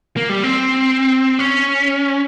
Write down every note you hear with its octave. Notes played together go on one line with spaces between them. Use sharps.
A#3
G3
C4
C#4